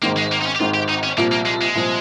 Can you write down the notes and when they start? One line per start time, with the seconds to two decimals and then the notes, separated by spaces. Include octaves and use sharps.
0.02 G#1 G#2 D#3 A#3
0.17 G#3
0.31 A#3
0.41 D#4
0.46 C#4
0.55 G4
0.60 G#1 G#2 D#3 F4
0.74 G4
0.89 D#4
1.03 C#4
1.17 C2 A#2 F3 A#3
1.32 A#3
1.46 G#3
1.61 G#3
1.75 C2 A#2 F3